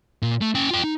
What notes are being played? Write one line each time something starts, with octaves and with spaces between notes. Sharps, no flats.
A#2
A3
C#4 G5
F4 G5
D#4